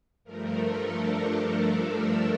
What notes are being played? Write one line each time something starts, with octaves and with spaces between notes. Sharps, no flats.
G2 F3 A3 A#4
A4
D4
D4
D4